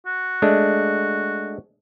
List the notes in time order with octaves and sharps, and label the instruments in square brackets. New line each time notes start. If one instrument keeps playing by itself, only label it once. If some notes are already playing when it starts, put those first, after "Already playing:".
[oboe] F#4
[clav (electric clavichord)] G#3 A3 D4